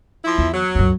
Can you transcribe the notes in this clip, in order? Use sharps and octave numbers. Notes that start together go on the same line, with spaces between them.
F3 E4
E2
F#3
C#2 F#2